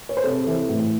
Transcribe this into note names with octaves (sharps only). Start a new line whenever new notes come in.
C#5
C5
C3 A4
E3
A2